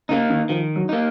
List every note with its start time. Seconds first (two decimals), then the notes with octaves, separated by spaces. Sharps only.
0.09 C#3 A#3 D#4
0.30 D#3
0.49 D#3 F3
0.76 F#3
0.89 A#3 D#4